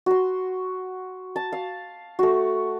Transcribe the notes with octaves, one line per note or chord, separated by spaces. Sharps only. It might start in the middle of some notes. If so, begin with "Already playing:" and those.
F#4 C6
A5
F5
A3 F#4